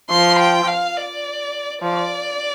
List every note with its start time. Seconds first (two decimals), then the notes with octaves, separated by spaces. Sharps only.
0.10 F3 C6
0.39 G5
0.68 F5
0.96 D5
1.82 F3 D5